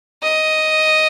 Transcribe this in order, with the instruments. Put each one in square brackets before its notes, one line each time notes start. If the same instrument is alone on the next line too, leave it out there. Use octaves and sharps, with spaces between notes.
[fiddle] D#5